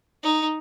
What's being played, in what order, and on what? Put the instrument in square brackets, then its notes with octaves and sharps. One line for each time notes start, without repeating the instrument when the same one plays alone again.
[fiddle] D#4